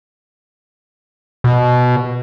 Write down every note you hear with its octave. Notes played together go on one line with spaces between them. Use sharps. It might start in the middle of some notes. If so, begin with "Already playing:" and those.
B2